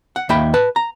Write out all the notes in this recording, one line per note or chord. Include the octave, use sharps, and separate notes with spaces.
F#5
D#2 A#3 E5 G5 B5
B4 A5
A#5